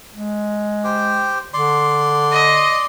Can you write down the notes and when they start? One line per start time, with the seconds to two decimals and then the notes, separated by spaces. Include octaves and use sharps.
0.13 G#3
0.84 G4 C5 G5
1.54 D3 D5 C6
2.32 D#5